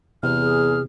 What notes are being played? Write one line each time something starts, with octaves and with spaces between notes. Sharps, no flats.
E2 C3 F6
G#4